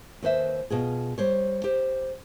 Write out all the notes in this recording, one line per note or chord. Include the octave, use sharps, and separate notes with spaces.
D#2 B4 C5 E5
B2 F4 G#4
G3 C5 C#5
G4 C5